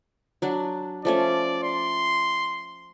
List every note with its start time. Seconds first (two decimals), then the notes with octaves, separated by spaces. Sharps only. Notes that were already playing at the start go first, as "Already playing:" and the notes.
0.42 F#3 D4 F#5
1.05 F3 A3 C#4 D5
1.63 C6